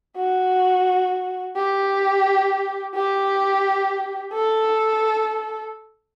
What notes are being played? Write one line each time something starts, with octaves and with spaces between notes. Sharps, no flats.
F#4
G4
G4
A4